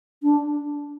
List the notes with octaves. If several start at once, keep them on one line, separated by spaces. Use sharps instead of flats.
D4